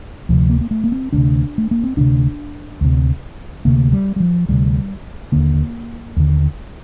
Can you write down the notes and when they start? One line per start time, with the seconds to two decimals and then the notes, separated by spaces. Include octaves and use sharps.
0.29 D2 C3 F3
0.50 A#3
0.61 A#3
0.71 A3
0.84 A#3
0.92 C4
1.13 D2 C3 D4
1.58 A3
1.71 A#3
1.84 C4
1.97 D2 C3 D4
2.81 D2 C3
3.65 D2 C3 A#3
3.93 G3
4.16 G3
4.20 F3
4.49 D2 C3 G3
5.32 D#2 D3 A#3
6.17 D#2 D3